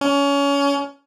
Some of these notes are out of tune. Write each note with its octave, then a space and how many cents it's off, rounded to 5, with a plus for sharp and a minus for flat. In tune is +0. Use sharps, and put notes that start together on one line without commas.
C#4 +25